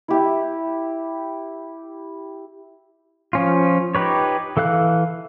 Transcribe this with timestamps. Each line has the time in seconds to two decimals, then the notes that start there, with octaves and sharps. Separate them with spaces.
0.08 E4 G4 E5
3.33 F3 C#4 F4
3.95 D#4 G4 B4 C#5
4.57 E3 A4 F5 F#6